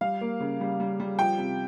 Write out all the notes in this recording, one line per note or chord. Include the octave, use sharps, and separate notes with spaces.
G3 F5
A#3
C#3
G3
G3
G3
F3 G5
C3